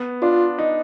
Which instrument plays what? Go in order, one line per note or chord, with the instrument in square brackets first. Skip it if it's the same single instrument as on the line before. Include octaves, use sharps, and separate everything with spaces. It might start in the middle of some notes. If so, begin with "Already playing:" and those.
Already playing: [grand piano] B3
[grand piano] D4 [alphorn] F4
[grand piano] D#4